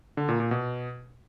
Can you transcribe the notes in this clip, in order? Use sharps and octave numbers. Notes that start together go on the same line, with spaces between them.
D3
A#2
A#2
B2